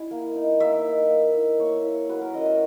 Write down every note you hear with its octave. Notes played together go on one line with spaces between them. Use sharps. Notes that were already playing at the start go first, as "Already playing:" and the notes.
Already playing: E4 G#5
A#3
D#4
A#3 E5
D#4
A#3
E4
A#3 C#5
E4
F#3 B4
A#4
C#4 E4 D#5
E5